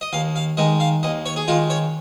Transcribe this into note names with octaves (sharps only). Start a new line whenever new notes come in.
D#5
D#2 F5
F5
D#3 G#3 D#5
F5
D#2 D#5
C#5
G#4
D#3 G#3 F4
C#5